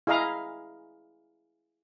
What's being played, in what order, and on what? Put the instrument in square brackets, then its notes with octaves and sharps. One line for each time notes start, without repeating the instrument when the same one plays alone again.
[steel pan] E4 G#4 D#5 F5 A#5